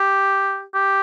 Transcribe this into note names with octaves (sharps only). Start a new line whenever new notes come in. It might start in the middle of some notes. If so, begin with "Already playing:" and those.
Already playing: G4
G4